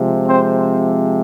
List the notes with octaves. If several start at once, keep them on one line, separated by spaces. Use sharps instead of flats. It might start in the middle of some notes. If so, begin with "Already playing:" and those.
Already playing: C3 F3 G#3
C4 C5